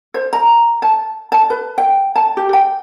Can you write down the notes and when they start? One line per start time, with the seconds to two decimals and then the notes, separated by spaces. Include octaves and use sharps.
0.14 C5
0.33 A#5
0.82 A5
1.32 A5
1.50 B4
1.78 G5
2.16 A5
2.37 G4
2.53 G5